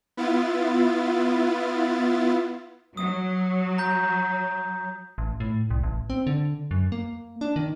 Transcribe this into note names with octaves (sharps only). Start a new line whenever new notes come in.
B3 E4 F4 A6
F#3 D#6
A#5 G6
A1
A2
C2
A1
C4
D3
F#2
A#3
D4
D#3